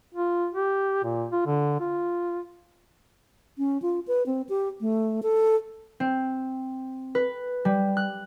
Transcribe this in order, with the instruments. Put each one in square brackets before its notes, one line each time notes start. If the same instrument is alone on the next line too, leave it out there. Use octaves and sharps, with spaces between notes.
[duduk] F4
G4
A#2
F4
D3
F4
[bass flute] C#4
F4
B4
C4
G4
A3
A4
[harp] C4
B4
G3
F#6